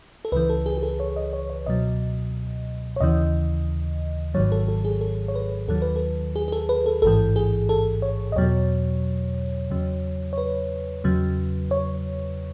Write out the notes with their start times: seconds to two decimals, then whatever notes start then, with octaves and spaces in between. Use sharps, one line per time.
0.25 A4
0.32 C#2 C#3 E3 B4
0.50 A4
0.66 G#4
0.77 G#4
0.83 A4
1.00 C#5
1.16 D#5
1.33 C#5
1.50 C#5
1.66 C#2 B2 F#3 D#5
2.96 C#5
3.00 D#2 C#3 E3 D#5
4.34 G#1 G#2 D#3 F#3 C#5
4.52 A4
4.68 A4
4.85 G#4
5.01 A4
5.28 C#5
5.35 B4
5.68 D#2 D#3 F#3 A4
5.82 B4
5.96 A4
6.36 G#4
6.48 G#4
6.52 A4
6.69 B4
6.86 A4
7.02 A1 G#2 E3 A4
7.36 G#4
7.69 A4
8.02 C#5
8.32 D#5
8.36 E2 B2 F#3 C#5
9.70 E2 C#3 F#3
10.33 C#5
10.38 B4
11.04 E2 C#3 F#3
11.71 C#5